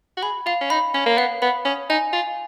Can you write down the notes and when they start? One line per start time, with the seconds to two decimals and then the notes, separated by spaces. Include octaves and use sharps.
0.17 F#4
0.23 G#4 B5
0.46 F4 F5
0.61 C#4
0.70 D#4 B5
0.94 C#4 C#5
1.06 A#3
1.18 B3 F5
1.42 B3 B5
1.65 C#4 D#6
1.90 D#4 G#5
2.13 F4 F5